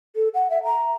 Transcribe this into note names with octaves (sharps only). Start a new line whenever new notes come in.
A4
F#5
E5
A#5